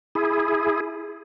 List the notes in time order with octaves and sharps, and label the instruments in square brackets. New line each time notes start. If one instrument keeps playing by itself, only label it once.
[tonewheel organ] E4 G#4